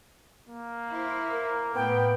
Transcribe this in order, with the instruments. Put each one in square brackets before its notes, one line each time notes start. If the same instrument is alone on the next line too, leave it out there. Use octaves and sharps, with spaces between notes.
[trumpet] A#3
[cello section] E4 C5
[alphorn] A#4
[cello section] A2 [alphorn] B3 [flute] G5